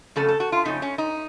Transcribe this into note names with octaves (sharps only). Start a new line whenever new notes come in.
F2 C#3 F#3 A3 C#4 A4
A4
F#4
F4
F2 C#3 F#3 A3 C#4 D#4
C#4
D#4